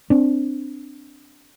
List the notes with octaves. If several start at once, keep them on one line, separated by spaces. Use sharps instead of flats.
C4 D4